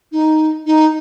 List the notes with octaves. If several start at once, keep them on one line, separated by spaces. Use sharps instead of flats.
D#4
D#4